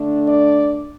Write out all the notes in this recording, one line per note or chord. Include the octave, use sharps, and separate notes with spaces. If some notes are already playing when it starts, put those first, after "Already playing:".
Already playing: D3 A3 D4
D5